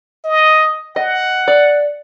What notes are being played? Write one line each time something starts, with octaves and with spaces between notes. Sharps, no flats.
D#5
D#5 F#5
D5